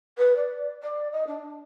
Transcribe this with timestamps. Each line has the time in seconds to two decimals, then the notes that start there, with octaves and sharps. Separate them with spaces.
0.18 B4
0.36 D5
0.83 D5
1.12 D#5
1.27 D4